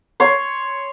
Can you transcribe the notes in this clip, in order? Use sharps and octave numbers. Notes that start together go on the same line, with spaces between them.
C#5 C6